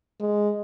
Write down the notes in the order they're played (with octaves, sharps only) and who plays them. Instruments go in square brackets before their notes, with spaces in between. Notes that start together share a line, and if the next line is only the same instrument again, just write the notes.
[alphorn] G#3